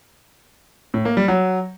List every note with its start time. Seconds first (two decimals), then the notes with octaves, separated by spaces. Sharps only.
0.94 A2
1.05 A#3
1.17 G3
1.28 F#3